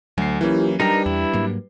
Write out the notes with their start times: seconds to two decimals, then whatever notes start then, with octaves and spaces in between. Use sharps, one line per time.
0.18 D2 F#3 C7
0.41 E3 A#3 C#4 E4 F4 G4
0.80 G3 D4 D#4 G4 A#4 B4 A#5
1.06 E2 E4
1.34 G#2 F#3 A#3